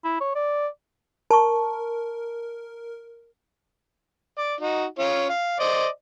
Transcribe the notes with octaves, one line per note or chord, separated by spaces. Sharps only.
E4
C#5
D5
A#4 A5 C#6
D5
D#4 F#4
C#4 F4 C#5
F5
C5 D5 D#5